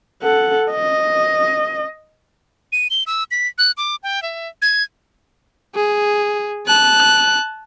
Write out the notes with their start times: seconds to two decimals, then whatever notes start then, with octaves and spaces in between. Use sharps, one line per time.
0.23 A4 F#5
0.72 D#5
2.72 D#7
2.90 G7
3.07 E6
3.31 B6
3.58 F#6
3.77 D6
4.03 G5
4.22 E5
4.62 G#6
5.75 G#4
6.67 A5 F#6